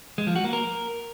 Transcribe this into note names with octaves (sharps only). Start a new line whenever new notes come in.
G#3
F3
F#4
A#3
A#4